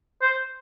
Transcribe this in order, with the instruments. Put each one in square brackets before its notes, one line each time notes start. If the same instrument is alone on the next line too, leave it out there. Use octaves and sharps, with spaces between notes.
[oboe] C5